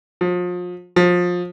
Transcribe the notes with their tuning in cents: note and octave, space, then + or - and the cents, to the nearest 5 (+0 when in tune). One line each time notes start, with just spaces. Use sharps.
F3 +35
F3 +25